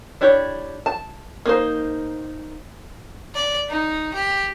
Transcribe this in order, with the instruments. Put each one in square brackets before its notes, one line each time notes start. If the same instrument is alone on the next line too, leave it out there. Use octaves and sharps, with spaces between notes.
[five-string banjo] D4 E4 G4 C#5
A5
A#3 D#4 C5
[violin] D5
D#4
G4